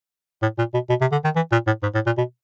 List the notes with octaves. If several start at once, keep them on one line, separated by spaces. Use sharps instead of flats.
A2
A#2
B2
B2
C3
D3
D#3
E3
A#2
A2
G#2
A2
A#2
B2